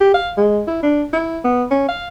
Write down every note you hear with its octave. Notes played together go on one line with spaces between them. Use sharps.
G4
F5
G#3
E4
D4
E4
B3
C#4
F5